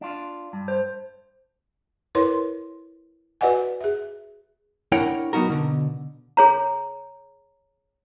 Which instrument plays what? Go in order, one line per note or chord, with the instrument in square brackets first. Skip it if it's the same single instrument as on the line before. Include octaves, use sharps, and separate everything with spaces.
[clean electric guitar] D4 F4
G2
[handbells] C5
[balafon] E4 A#4 B4 C#5 C6
F#4 B4 D5 D#5 F#5 G#5
G#4 E5
[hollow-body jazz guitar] D4 E4 A#4 C#5 F#5 G5
F#3 B3 D#4 F#4 A#4
B2 D3
[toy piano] G#4 C#5 A#5